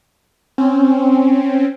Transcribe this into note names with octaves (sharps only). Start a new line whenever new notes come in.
C4 C#4